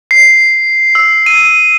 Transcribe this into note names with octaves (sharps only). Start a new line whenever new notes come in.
C7
E6
D#7